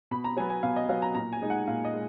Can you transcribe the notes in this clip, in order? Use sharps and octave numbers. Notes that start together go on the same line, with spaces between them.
B2 B5
A#5
F#3 B3 G#5
G#5
B2 F5
D#5
F#3 B3 F5
A#5
A#2 A#5
G#5
G#3 D#4
F#5
A#2 F5
D#5
G#3